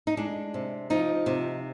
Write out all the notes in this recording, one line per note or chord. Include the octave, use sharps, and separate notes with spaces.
D#4
G#3 D4
C3
F3 D#4
C3